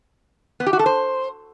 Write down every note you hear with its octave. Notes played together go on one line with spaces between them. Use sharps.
B3
G4
F#4
A4
C5